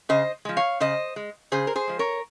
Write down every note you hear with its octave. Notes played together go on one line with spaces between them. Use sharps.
C#3 C5 D#5
F3 G#3
C#5 F5
C#3 C5 D#5
G#3
C#3 G#4 C5
A#4
G#4 C5
F3 G#3
A#4 C#5